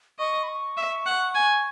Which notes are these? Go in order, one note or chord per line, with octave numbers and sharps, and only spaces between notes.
D#5 C#6
B5
C#6
E5
F#5
G#5